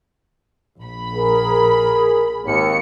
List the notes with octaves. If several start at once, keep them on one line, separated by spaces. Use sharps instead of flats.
A#1 B5
G#4 A#4
G#1 D#2 C#7